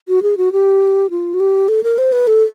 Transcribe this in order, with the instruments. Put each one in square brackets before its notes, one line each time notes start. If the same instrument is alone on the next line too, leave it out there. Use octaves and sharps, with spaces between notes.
[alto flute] F#4
G#4
F#4
G4
F4
F#4
G4
A4
A#4
C5
B4
A4